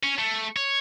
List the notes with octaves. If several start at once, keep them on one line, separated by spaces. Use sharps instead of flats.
C#4
A3
C#5